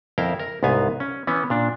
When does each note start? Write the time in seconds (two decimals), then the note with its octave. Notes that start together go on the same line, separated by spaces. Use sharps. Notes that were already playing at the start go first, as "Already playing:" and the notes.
0.18 F2 E4 A#4 F5 G5
0.39 A#4
0.63 C2 G#2 B3 F5 G#5
1.00 C#4
1.27 E3 B3 C#4
1.50 A#2 D4